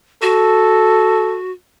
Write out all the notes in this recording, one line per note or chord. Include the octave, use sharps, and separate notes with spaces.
F#4 A4